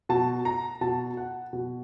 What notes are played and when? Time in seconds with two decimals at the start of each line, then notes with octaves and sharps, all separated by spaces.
0.09 B2 A5
0.45 A#5
0.81 B2 A5
1.17 F#5
1.53 B2